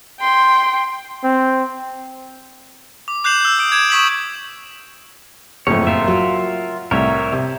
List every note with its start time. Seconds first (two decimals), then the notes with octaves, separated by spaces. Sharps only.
0.20 G5 C6
1.24 C4
3.08 D6
3.24 D6 F#6 G6 C7 E7 F#7
3.40 E6 G6
3.59 D#6 D7
3.71 D6 G#6 D7 E7
3.90 C#6 D#6 B6 E7 F#7
5.67 F#1 F2 A2 C#5
5.87 F4 A#4 E5
6.08 F#3
6.91 C2 A2 A#4 C#5 E5
7.32 C3